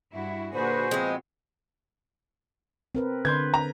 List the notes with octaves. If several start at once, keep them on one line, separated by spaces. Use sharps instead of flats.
G2 E4 F#4 E5
A#2 D3 F#4 G#4 B4 C5
F3 G#3 B3 C4
C4 A#4 B4
D3 B4 C6 G6 G#6
A#5